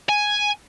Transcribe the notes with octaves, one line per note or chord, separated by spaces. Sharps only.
G#5